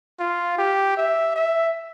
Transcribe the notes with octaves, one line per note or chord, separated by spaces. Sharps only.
F4
G4
E5
E5